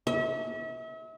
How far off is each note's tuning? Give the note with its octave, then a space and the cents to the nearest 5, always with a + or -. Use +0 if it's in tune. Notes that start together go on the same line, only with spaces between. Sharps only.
E5 -40